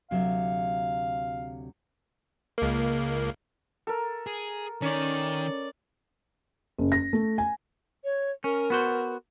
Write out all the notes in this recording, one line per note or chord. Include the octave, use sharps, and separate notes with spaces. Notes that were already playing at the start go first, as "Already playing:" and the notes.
D2 C3 F#3 F5
C#2 A#3
A4 A#4
G#4
D#3 C#4 D5
F#1
A#6
A3
G#5
C#5
C#4 A#4
B3 F#4 C5